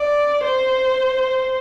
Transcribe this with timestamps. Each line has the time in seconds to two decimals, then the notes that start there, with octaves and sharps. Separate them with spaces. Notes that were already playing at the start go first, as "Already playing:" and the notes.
Already playing: D5
0.45 C5